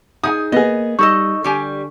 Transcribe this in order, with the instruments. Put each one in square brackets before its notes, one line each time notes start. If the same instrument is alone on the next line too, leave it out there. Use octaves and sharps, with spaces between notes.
[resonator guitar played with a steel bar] D#4 G#4 G#5 [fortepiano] D#6
[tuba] A#3 [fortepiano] B3 G#4 [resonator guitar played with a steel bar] D#5
[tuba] G3 [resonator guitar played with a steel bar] D#4 A4 D#5 [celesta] C#6
[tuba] D3 [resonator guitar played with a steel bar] G3 G4 G#5